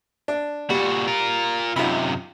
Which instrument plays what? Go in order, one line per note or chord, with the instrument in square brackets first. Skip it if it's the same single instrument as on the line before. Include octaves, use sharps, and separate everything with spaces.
[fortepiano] D4
[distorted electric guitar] A#2 F#4 [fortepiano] G3
[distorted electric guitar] F4 A#4
[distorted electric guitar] F#2 C3 [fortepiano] D#4 F4 B5